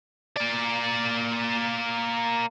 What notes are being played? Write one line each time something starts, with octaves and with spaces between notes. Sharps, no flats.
A#3 D5